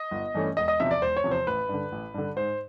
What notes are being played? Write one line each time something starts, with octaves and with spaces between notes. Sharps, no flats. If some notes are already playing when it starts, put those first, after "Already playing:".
Already playing: D#5
G1
G2 E3 A3 C#4
E1 D#5
D#5
E2 C3 F3 E5
D5
E1 C5
C#5
E2 C3 F3
C5
A1 B4
G2 D3
A1
G2 D3
G#2 C5